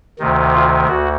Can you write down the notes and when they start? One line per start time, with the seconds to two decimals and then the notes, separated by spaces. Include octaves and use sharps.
0.19 D2 C3 D#3
0.53 F4
0.88 D2 F#4